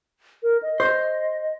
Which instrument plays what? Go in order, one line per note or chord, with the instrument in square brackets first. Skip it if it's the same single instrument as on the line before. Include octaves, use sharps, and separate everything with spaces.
[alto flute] A#4
D#5
[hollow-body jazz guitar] C5